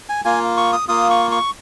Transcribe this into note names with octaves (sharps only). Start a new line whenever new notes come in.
G#5
A#3 F4 G#5
C#6
D#6
A#3 F4 D#6
C#6
C#6